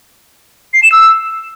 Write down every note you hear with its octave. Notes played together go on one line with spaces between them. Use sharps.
C7
E7
E6